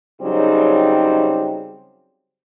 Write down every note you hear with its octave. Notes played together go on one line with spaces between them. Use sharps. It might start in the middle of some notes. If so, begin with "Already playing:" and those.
C#3 F#3 G3 C4 D#4